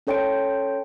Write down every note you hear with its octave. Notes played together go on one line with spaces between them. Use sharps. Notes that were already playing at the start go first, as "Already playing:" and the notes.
C#4 A4 C#5 G5 C6 D7